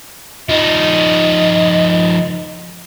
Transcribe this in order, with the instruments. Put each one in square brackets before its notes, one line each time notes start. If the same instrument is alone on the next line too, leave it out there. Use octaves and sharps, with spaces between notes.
[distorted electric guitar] F3 D#4 [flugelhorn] D#5